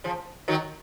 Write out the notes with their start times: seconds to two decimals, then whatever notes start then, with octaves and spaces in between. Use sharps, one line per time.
0.04 C#3 F3
0.48 D#3 F#3